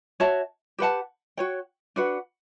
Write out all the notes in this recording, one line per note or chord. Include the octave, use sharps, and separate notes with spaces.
F#4 C#5 E5 A5
G4 B4 F#5 A5
F#4 C#5 G5
D4 F#4 B4 F#5